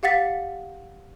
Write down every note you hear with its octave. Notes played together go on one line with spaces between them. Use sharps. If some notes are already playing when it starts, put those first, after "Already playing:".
G4 F5 F#5 A6 B6